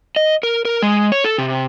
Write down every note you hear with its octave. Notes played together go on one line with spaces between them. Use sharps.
D#5
A#4
A#4
G#3
C#5
A4
C3